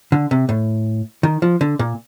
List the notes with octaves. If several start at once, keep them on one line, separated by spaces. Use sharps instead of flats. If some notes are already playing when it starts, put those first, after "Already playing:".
D3
C3
A2
D#3
F3
D3
A#2